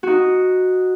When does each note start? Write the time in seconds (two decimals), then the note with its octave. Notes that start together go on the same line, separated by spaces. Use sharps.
0.03 D#4 F#4